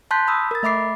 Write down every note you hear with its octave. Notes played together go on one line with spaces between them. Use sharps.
A5 C6 F#6 G6 B6
B5 D#6 E6
A#4 A6
A3 E5 B5 D6 C7